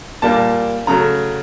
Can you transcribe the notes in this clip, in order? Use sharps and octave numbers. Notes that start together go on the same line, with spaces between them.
A#2 G3 A#3 D4 A5
C#3 F#3 A3 A#5